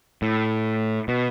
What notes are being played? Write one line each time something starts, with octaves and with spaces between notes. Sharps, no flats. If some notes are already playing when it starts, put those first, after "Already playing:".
A2
B2